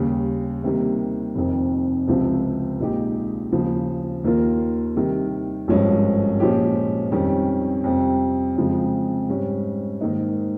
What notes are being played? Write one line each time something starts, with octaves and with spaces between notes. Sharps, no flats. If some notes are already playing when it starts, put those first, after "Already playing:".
Already playing: D#2 C#3 G3
C3 D#3 G3 A#3
F1 F2 D#3
C#2 C3 F3 C4
A#1 A#2 G#3 D#4 G4
D#2 C#3 F3
D#2 D#3 A#3 F4 A#4
C3 D#3 G3
G#1 G2 F3 G#3 C#4
A#2 F3 G#3 C#4 G4
F2 D#3 G3 C#4
F2 C3 G3
F2 C#3 F3 G#3
G#2 G3 C#4
G#2 D#3 A#3 D#4